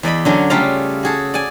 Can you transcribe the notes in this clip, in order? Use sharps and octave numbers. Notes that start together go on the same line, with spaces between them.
E2 D5 D#5 B5
D3 F#3 C#4 D4
C#3 G3 A3 F4 F5 A#5
F#4 G#4 A4
D5 G#5